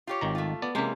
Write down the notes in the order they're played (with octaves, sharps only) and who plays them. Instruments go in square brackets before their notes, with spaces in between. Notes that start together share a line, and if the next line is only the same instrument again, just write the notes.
[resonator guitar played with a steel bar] F4 G4 C#5
[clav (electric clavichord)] G#1 D#3 A#5
[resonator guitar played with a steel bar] A3 F4
[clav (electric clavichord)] B3 D5 A5
[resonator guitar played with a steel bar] C3 E3 C#4 [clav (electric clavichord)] G#3 A#3